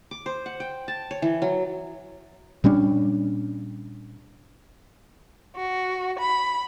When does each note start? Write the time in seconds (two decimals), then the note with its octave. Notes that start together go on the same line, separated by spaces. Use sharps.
0.11 D6
0.26 C5
0.46 F#5
0.60 G5
0.88 A5
1.11 C#5
1.22 E3
1.42 F#3
2.64 A#2 G3 C#4 D4
5.56 F#4
6.19 B5